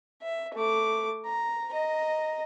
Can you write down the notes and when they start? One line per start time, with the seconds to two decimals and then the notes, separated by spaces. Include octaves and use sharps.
0.22 E5
0.54 A3 D6
1.25 A#5
1.73 D#5 A#5